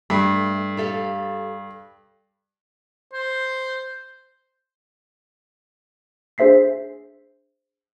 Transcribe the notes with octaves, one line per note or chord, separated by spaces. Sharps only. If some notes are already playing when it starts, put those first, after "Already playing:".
G2 A3
G4 A4 F5
C5
D4 G#4 C5 E5 B6 C7